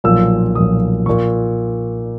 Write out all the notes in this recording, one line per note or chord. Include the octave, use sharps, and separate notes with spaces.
B1 A#2 F3 E6
B1 A#2 F3 D#6
A#2 F3 C#6